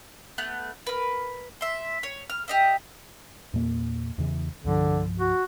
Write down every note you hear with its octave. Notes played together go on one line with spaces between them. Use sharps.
A3 B3 F#6
A#4 B4
E5 C6
C#5
F6
G4 D#5 E5
E2 A#2 A#3
E2 C#3 E3
C2 G2 D3 F3
F#4